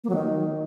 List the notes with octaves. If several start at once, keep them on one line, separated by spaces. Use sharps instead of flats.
A#3
F#3
D#3